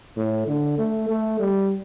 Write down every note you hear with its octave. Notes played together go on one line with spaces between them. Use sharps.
A2
D3
A3
A3
G3